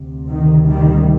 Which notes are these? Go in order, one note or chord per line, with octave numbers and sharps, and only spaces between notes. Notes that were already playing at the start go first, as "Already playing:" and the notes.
Already playing: D2 C3
D#3
D#3 G3